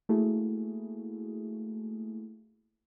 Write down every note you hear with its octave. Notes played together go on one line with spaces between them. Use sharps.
A3 A#3 E4 F#4 G#4